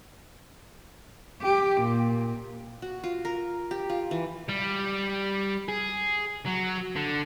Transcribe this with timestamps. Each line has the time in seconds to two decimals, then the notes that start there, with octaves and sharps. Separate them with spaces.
1.42 G4
1.82 A#2
2.82 F#4
3.04 F4
3.25 A#4
3.71 G4
3.90 F4
4.11 E3
4.49 G3
5.68 G#4
6.47 F#3
6.96 D3